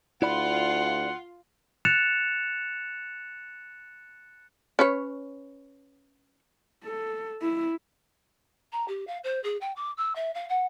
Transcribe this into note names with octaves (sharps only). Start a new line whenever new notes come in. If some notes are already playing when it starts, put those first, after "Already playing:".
D2 E4 F4 D5 F#5 B5
F#6 A6 C#7 E7 F7
C#4 B4 C#5
A4
E4
A#5
G4
F5
C5
G#4
G5
D6
E6
E5
F5
F#5